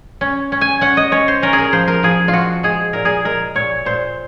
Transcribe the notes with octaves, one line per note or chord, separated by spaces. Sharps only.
C#4
C#4
G#5
C#4 F#5
D#5
C#4 C#5
C5
C#4 A#4
G#4
A#4
F3 C5
A#4
F3 G#4
F4
F3 F#4
G#3 G#4
A#2 A#4
G#4
G#3 A#4
A#2 C#5
A#2 C5